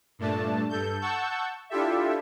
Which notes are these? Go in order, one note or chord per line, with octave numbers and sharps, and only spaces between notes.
G2 A#2 A3 D4 A5
G2 A4 G6
F#5 A5 C#6 E6 G6
D4 E4 F4 G4 A4 E5